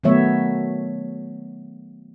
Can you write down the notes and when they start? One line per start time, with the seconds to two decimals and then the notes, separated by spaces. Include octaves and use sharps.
0.04 D#3 F#3 A3 B3 C#5 E5